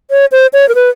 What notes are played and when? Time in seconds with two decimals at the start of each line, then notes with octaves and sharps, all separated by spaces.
0.11 C#5
0.32 C5
0.53 C#5
0.69 A#4
0.75 B4